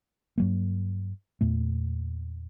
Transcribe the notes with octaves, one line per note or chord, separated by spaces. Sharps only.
G2 F#3 A#3
E2 A#2 A3